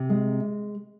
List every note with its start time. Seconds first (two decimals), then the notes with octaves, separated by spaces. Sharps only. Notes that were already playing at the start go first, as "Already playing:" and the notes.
Already playing: C3
0.10 G#3